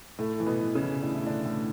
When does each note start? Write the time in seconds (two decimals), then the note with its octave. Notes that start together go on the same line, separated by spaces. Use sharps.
0.19 A2 A3
0.40 E3
0.46 B2 B3
0.61 E3
0.75 C#3 C#4
0.83 E3
1.03 A2 D4
1.14 E4
1.24 A2 D3 D4
1.45 A2